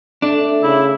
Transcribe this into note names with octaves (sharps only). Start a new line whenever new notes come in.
A3 D4
C#3 E4